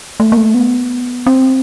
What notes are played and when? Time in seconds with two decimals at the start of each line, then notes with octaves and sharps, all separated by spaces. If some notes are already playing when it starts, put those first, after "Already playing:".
0.20 A3
0.32 A#3
0.37 A3
0.55 B3
1.27 C4